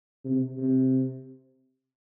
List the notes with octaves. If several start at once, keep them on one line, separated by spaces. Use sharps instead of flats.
C3
C3